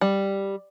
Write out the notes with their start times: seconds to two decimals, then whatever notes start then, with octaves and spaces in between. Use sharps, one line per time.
0.01 G3